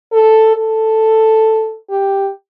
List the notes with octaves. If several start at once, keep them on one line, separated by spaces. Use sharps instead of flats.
A4
A4
G4